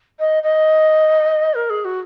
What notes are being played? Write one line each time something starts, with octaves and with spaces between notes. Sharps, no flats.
D#5
D#5
A#4
G#4
F#4